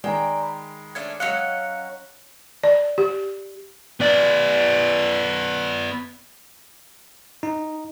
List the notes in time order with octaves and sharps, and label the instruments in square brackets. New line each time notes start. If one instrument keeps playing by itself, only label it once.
[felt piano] D#3 G#3 [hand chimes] D5 G#5 A#5 [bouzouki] G5
[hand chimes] B5
[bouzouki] A3 C#4 D4 [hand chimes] G#6
[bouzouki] F#3 C#4 D#5 [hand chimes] F5 F#6 C#7
[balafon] D5
G4
[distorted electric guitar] B3 D5
[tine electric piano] D#4